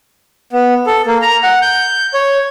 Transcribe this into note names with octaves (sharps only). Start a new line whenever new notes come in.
B3
A4
A#3
A#5
F#5
G6
C#5